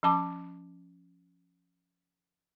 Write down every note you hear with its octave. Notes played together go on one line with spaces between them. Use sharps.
F3 C#4 A5 D6